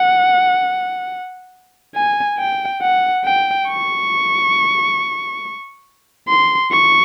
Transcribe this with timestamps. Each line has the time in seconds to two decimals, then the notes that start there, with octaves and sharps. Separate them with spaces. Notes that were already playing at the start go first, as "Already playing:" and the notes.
Already playing: F#5
1.95 G#5
2.39 G5
2.82 F#5
3.25 G5
3.69 C#6
6.29 C6
6.72 C#6